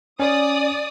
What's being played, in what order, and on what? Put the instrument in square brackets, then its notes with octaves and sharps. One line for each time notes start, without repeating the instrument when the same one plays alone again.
[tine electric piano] C#4 [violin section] D5 D#6